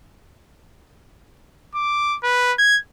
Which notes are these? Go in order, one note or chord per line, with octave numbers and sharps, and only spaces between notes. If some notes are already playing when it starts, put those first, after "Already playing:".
D6
B4
G#6